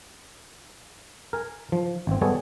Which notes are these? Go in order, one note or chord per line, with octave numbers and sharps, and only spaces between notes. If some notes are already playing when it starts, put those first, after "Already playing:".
A#4 G#5
F3
G#1 C4
G3 G#3 B3 G#4 A4 C#5